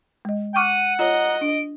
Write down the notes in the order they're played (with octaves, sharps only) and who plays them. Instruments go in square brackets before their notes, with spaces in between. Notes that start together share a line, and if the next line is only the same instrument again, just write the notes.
[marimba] G#3 D#5
[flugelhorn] F#5 [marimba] C#6 D6 F6 [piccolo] D#7
[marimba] F4 C#5 [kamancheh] D#5 [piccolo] A#5
[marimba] D4 [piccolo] D7